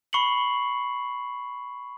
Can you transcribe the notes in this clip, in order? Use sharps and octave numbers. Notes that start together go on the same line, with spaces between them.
B5 C#6 C7 C#7 F#7